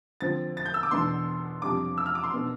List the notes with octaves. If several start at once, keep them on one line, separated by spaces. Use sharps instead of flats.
D3 F3 C4 A6
A6
G6
E6
D6
E2 B2 B3 D4 C6
F2 C3 G3 D4 D6
E6
F6
D6
C6
B2 B3 D4